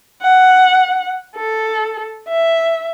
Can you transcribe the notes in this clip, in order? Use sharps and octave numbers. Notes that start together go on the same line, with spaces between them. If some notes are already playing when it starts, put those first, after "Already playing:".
F#5
A4
E5